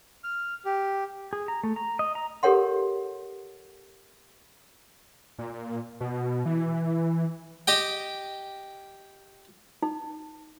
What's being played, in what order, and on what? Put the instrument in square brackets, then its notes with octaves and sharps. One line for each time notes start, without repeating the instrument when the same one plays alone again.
[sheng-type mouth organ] F6
G4
[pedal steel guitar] G#4
A#5
A3
A#5
D#5
A#5
[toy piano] G4 A4 A#4 C#5 F#5 C6
[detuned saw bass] A#2
B2
E3
[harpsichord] G4 D#5 G5
[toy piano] D#4